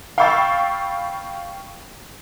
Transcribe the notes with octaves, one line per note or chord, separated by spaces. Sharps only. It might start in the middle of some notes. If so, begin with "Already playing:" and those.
F5 G5 B5 C#6 E6 A6